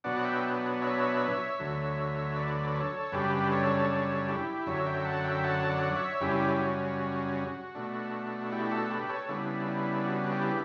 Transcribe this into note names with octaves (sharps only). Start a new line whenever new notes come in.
B2 F#3 B3 D4 D5 F#5
E5 G5
C#5 E5
D2 D3 F#3
B4 D5
A4 C#5
F#2 C#3 G3 D4 G4 B4
A4 C#5
A4 C#5
E4 G4
F#2 D3 F#3 C#5 E5
E5 G5
F#5 A5
E5 G5
F#5 A5
D5 F#5
C#5 E5
F#2 C#3 G3 C#4 E4 G4
F#4
B2 A3 D4
E4 G4
F#4 A4
G4 B4
A4 C#5
C#3 G3 B3 D4 E4
E4
F#4
E4 G4